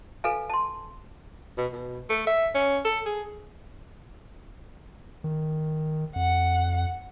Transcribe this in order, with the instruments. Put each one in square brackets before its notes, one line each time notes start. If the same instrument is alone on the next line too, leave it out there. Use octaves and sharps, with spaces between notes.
[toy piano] A4 B4 F5 G#5
A5 C6
[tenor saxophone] B2
B2
A3
E5
C#4
A4
G#4
[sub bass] D#3
[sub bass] F2 [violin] F#5